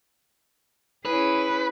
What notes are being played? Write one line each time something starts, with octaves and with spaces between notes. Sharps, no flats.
C#4 E4 G#4 B4